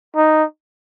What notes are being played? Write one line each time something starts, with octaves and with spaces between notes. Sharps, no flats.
D#4